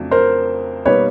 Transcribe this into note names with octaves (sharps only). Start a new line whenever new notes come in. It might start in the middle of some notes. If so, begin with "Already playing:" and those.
Already playing: F2 C#3 F#3 A3 D4
A#4 C5
B2 G3 A#3 D#4 B4 C#5